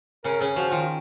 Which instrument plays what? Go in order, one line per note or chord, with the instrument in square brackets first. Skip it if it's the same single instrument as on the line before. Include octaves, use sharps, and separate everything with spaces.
[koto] C#3 C#4 [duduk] A#4
[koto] C#3 C#4 [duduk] G#4
[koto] F3 [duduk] F#4
[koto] D#3 [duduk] F4